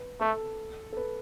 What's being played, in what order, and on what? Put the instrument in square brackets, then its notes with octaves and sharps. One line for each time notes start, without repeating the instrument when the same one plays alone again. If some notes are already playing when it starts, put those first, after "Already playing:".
Already playing: [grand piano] B4
[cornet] A3 [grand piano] A4
[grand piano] A4
B4